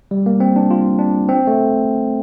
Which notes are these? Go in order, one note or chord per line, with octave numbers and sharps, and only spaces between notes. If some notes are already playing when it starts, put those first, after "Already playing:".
G3
A#3
C4
D4
F4
D4
C4
A3